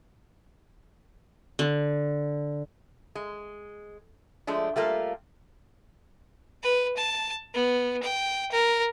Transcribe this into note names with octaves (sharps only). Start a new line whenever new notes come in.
D3
G#3
F3 G#3 A3 D4
G3 A3 A#3 F4
B4
A5
B3
G5
A#4